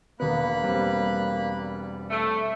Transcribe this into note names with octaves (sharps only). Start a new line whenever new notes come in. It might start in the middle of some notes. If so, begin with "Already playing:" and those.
E1 A#3 B3 B5 F#6
G3 C4
A3 E5